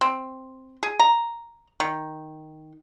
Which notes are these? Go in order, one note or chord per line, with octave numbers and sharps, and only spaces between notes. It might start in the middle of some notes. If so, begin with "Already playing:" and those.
C4
G#4
A#5
D#3